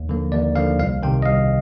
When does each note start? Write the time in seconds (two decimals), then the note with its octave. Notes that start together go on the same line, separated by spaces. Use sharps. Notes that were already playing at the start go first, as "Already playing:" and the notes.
Already playing: D#2
0.09 D3 F3 A#3
0.32 D#2 D5
0.56 D3 F3 A#3 F5
0.79 C2 F5
1.03 C3 D#3 G5
1.22 D#5
1.26 C2 F5